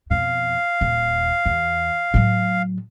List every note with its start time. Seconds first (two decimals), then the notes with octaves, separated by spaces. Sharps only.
0.11 F2 B2 F5
0.81 D#1
1.46 E2
2.14 A2 F#3